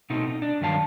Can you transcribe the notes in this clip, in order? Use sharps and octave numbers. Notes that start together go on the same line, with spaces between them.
B2 A3 C4 D#4
D#4
D4
G2 D#3 F#3 F5 A5